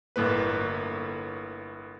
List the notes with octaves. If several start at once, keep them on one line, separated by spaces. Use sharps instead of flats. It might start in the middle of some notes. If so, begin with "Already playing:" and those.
G1 A2 A#3 B4